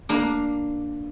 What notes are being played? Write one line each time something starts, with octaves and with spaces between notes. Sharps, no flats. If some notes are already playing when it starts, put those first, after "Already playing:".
A#3 D4